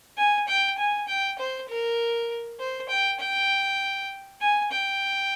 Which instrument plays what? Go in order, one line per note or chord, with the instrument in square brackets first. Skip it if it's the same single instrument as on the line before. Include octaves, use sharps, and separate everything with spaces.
[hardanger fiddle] G#5
G5
G#5
G5
C5
A#4
C5
G5
G5
G#5
G5